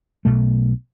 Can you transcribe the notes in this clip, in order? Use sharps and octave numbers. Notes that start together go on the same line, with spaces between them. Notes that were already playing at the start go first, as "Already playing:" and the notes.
B1 B2 A3